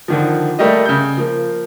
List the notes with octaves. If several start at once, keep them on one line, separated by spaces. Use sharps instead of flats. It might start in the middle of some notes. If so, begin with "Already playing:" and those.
D3 D#3 F3
G3 A3 A#3 G4 D#5
C#3 G6
F3 A#3